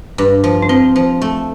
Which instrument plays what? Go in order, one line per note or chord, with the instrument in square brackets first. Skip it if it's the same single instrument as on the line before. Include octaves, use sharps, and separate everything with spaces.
[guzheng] G2
F3
[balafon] D4
[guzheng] F3 [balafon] C4
[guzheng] F3
A3